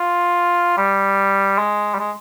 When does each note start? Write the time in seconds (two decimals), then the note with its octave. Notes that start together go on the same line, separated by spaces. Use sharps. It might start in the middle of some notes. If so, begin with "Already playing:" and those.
Already playing: F4
0.77 G3
1.58 G#3
1.94 G3
1.99 G#3